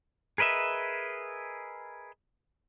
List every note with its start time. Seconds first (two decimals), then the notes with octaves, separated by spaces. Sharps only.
0.38 G#4 A#4 B4 D#5 E5